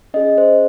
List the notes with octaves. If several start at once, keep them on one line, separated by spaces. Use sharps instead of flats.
C#4 G#4 D#5
C5